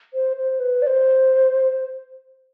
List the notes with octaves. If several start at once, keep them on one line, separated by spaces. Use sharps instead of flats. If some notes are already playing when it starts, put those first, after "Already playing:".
C5
C5
B4
D5
C5